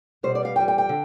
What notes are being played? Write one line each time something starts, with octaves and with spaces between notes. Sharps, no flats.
B2 G3 B3 C5
D5
F5
F2 E3 G3 G5
G5
G5
D3